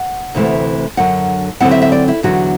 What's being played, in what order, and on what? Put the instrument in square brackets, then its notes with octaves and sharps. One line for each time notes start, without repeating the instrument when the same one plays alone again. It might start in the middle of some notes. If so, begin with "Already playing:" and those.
Already playing: [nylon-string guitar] F#5
D2 C3 E3 A3
F#2 D3 F#3 F#5
D3 F#3 C4 E4 F#5
E5
E5
D5
E4
E2 D3 F#3 F#4